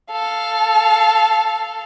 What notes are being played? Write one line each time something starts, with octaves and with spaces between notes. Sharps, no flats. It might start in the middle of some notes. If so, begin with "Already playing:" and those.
A4 F5